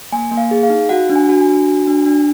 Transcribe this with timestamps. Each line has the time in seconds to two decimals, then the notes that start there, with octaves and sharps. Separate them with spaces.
0.12 A#3 G#5
0.31 A#3
0.37 F5
0.51 G#4
0.63 F5
0.70 D#4
0.89 F#4 F#5
1.10 D4
1.16 G#5
1.29 F#4
1.41 G#5
1.49 D4
1.68 F#4
1.87 D4
2.06 D4